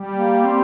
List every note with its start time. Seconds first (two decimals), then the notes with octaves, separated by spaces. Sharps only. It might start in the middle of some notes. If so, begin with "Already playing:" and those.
Already playing: G3
0.15 A#3
0.44 C4